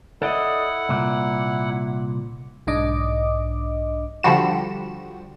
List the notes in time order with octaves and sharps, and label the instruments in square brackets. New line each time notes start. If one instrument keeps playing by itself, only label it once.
[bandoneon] E4 F#5 [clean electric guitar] A4 D5 D#5
[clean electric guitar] C2 A#2
[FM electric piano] B1 G#2 D4 D#5 D6
[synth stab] D3 F3 G3 F#4 E7